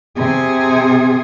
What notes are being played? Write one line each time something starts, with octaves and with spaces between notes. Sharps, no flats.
C3 G#4